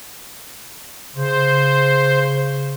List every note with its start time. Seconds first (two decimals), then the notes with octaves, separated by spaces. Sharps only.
1.16 C#3 C5